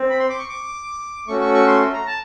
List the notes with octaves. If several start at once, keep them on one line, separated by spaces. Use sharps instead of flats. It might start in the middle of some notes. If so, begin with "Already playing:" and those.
Already playing: C4
B5
C6
D6
C#6
D6
A3 C#4 F#4 C#6
C#6
C#6
C6
A#5
A5